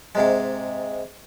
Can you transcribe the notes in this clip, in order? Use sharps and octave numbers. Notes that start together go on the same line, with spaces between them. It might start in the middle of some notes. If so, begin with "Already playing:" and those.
G#2 C3 G#3